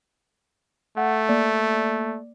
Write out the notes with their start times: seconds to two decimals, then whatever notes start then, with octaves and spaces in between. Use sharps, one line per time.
0.97 A3 F#5
1.29 A#3 D5